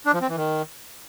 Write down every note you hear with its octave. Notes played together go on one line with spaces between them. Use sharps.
D4
F3
C4
E3
D#3